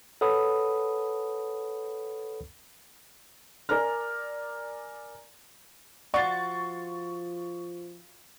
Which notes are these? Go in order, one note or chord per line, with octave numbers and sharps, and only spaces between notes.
A4 B4 C#5 F#5 B5 D#6
A#4 D5 G#5 A#5 F6
F3 F4 F#4 D5 C#6 A6